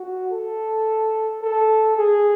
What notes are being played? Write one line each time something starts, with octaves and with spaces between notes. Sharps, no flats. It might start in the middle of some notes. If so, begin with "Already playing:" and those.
Already playing: F#4
A4
A4
G#4